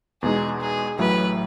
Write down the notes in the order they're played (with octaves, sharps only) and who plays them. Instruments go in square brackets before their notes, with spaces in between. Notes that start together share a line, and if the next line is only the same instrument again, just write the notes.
[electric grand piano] E2 B2 G#3 D#4 [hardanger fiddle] G#4
[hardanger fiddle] G#4
[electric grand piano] A1 A2 F#3 A3 [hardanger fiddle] B4